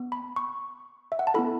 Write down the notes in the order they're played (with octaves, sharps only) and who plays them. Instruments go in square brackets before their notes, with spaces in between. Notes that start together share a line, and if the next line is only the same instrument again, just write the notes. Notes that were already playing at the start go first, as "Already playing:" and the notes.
Already playing: [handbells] B3
B5
C#6
E5
F#5
A5
B3 E4 A4 B5